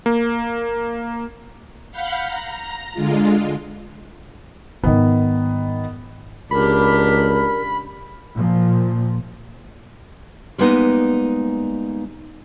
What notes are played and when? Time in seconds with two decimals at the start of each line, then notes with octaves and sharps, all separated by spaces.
0.06 A#3
1.92 F5 F#5 B5 F6 G6
2.26 A#5
2.94 D3 G#3 F4
4.84 G#2 D#3 G3 B3
6.51 C#2 D4 G4 A#4 B5
8.35 A#2 F3
10.58 G3 G#3 A#3 B3 D#4